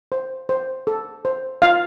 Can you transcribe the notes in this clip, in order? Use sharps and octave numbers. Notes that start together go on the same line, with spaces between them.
C5
C5
A4
C5
F4 F5